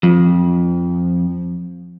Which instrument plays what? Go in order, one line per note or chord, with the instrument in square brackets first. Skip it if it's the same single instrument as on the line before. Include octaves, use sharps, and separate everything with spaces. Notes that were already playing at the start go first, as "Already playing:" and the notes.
[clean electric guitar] F2 [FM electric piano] F3